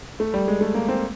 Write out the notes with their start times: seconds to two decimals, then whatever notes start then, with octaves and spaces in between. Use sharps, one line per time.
0.20 A3
0.34 G3
0.48 G#3
0.61 A3
0.74 A#3
0.88 C4